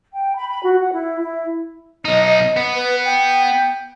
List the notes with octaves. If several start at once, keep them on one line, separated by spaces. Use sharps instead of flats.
G5
B5
B5
F#4
F#5
E4
E4
B1 D#4 D#5
B3
B4
G5